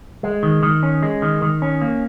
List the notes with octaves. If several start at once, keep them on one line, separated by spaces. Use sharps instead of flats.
G#3
D#3
D#3
C#4
G#3
D#3
D#3
C#4
A#3